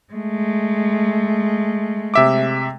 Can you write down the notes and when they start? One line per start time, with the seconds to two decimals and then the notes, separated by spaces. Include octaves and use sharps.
0.13 G#3 A3
2.14 C3 E5 D6